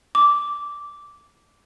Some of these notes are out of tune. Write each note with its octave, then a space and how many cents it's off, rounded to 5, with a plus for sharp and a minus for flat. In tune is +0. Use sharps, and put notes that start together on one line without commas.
D6 -10